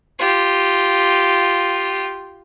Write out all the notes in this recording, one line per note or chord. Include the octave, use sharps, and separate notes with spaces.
F4 G4